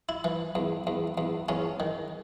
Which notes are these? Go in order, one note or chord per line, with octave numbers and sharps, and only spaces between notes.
E4
E3
E2
E2
E2
E2 C#4
D#3